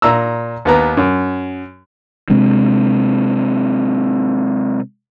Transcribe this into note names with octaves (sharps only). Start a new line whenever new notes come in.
A#2 A#5 E6
D#2 B3 A#5
F#2
C3 G#3 C4 D4